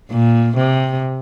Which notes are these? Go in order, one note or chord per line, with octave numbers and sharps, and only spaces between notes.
A#2
C3